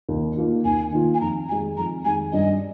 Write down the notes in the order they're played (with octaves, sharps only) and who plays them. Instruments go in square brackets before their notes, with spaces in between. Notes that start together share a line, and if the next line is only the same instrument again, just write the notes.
[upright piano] D#2
D#3 A#3 F4
[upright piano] D#2 [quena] G#5
[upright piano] D#3 A#3 F4
[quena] G#5
[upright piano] F2 [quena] A#5
[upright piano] D#3 G#3 [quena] G#5
[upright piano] F2 [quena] A#5
[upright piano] D#3 G#3 [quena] G#5
[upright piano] G2 [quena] D#5